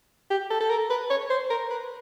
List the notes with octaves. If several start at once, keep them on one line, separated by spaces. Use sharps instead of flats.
G4
A4
A4
A#4
B4
C#5
C5
A#4
B4